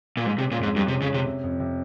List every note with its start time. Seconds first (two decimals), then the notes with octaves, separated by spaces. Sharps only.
0.17 A#2
0.26 G#2 G#3
0.38 C3
0.42 C#4
0.51 A#2
0.59 F2 G#2
0.75 G2 G#3
0.88 C3
0.93 C#4
1.02 C#3
1.10 C3 C#4
1.26 C3
1.44 F2
1.60 C3